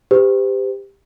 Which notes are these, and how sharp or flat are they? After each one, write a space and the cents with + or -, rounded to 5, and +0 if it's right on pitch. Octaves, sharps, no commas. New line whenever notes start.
G4 +15 C5 -45